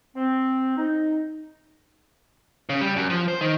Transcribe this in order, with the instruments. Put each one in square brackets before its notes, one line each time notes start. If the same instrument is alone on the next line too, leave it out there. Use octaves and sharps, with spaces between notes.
[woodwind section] C4
D#4
[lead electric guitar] C#3
G3
F#2
F3
C5
D#3